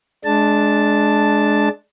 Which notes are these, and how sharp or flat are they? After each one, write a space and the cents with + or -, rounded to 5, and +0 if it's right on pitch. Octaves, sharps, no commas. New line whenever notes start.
G#3 +25 D4 +0 A5 +0